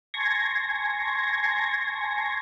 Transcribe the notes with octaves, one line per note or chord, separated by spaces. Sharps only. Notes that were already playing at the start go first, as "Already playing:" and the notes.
G#5 A5 C6 C#6 G#6 A#6